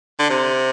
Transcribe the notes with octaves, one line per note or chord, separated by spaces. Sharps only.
D3
C3